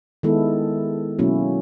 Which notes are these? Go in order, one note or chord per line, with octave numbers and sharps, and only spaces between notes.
D#3 G#3 B3 E4 A4
B2 F#3 A#3 C#4 E4